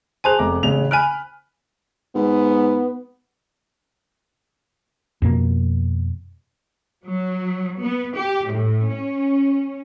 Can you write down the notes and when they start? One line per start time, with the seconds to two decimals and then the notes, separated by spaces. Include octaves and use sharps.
0.24 G#4 C5 G#5 A5 C6 F#6
0.39 F1 A#5 D6
0.63 A1 C#3 F7
0.91 G#5 B5 F6 F#6 D7
2.15 G#2 B3
5.22 F2 B2 A#3
7.06 F#3
7.82 B3
8.17 G4
8.50 A2
8.90 C#4